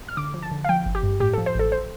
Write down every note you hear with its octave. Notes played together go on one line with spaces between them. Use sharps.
F6
D3 D6
F3
A5
D3
F5
F3 G5
G1
G4
G2
A2 G4
F3 A4
C5
A1 A4
C5